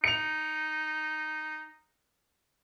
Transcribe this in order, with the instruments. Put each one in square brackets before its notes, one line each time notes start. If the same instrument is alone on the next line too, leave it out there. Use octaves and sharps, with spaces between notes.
[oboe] D#4 [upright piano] C#7 F7